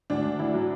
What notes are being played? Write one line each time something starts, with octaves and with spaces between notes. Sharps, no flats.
D2 D4
D2
D2 E4
F#3